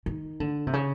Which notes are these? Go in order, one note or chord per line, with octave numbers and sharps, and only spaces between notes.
D#3
D3
C3
C#3